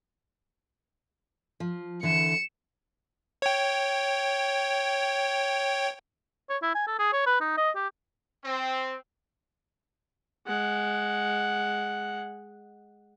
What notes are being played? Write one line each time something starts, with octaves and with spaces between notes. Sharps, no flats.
F3
D3 E3 C#7 E7
C#5 G5
C#5
E4
G#5
A4
G#4
C#5
B4
D#4
D#5
G4
C4
G#3 F#5